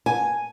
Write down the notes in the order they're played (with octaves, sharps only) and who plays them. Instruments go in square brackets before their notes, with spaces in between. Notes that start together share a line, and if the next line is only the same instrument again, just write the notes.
[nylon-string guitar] G#5